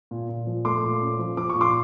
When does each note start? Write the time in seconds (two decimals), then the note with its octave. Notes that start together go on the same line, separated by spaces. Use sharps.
0.11 A#2
0.29 A#2
0.47 F3
0.65 A3 C6 D6
0.83 A#2
1.02 C#4
1.19 F3
1.37 F3 D6
1.50 C#6
1.55 A#2
1.61 C6 D6